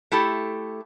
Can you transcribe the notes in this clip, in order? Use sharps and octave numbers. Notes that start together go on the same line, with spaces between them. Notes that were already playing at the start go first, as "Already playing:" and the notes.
A3 E4 G4 A4